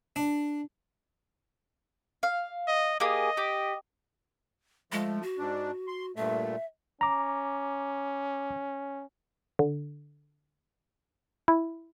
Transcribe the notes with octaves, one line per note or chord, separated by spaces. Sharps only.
D4
F5
D#5
A#3 G4 G#4 D#5
G4
F3 G#3 A3
F#4
G#2 D4
C6
G2 A#2 A3 E5
C#4 A#5 D6
D3
E4